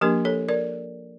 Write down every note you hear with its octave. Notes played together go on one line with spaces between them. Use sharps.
F3 A#3 D4 G4 A#4
A4 C#5
A#4 D5